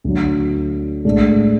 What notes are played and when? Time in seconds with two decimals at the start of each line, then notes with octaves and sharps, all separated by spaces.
0.04 D2 D3 F#3
1.05 A2 G#3 D4